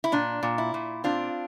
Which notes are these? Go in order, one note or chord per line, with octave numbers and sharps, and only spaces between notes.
E4
A#2 D4
A#2
E4
A#2
C4 D4 F4